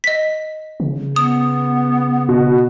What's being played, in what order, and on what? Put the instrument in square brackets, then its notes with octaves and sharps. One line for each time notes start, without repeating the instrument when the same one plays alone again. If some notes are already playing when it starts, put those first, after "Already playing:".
[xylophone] D#5 B6
[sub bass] C#3
[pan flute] B3 [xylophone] D#6
[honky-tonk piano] B2